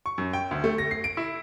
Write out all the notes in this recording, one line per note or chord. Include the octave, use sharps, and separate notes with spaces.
C#6
F#2
G5
D2
A3
A#6
C7
D7
E4